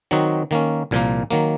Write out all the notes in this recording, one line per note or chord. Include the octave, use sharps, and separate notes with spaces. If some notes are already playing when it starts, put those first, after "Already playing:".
D#3 F#3 C4 D#4 F#4
D#3 A#3 C#4
C2 A#2 F3 A#3
D#3 F#3 A#3